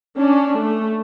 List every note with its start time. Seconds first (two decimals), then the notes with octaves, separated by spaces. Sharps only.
0.17 C#4 D4
0.59 A3